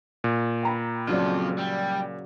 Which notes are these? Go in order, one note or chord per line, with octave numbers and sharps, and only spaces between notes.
A#2
G5 A#5 B5
F2 C#3 F#3 F4 D5
G3